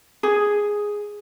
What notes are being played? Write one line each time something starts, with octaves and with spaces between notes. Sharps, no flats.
G#4